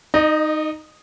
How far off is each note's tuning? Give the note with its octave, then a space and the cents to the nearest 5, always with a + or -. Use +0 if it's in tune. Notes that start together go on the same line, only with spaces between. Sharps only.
D#4 +0 D#5 -35